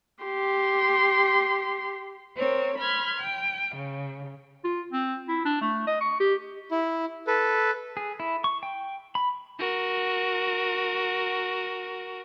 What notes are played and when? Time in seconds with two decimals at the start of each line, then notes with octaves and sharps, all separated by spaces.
0.23 G4 C6
2.37 C4 A#4 C#5
2.77 B5 C6 F6 G#6
3.20 G5
3.76 C#3
4.65 F4
4.93 C4
5.29 E4
5.45 D4
5.61 A3
5.87 D#5
6.01 C#6
6.20 G4
6.71 E4
7.27 A4 B4
7.97 G#4
8.20 E4
8.44 C#6
8.63 G5
9.15 B5
9.59 F#4 A#4